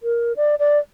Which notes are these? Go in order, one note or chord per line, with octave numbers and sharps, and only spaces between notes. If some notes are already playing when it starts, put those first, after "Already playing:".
A#4
D5
D5